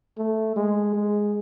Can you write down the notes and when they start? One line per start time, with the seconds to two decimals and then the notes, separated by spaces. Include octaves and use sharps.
0.18 A3
0.56 G#3
0.94 G#3